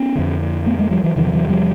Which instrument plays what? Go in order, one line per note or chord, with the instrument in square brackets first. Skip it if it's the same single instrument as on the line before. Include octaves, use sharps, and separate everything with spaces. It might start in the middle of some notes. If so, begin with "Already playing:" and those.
Already playing: [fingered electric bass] B3 C#4
F2 D3
A3 B3
G#3 A#3
F3 G3
E3 F#3
E2 C3 D#3 F3
F3
E3 F#3
F3 G3